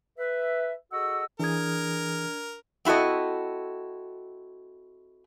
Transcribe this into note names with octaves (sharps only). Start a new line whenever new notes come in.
B4 E5
F#4 G#4 A4 D#5 F#5 E6
E3 D4 G#4 A#4 D#6 G#6
C4 E4 F#4 A4 D#5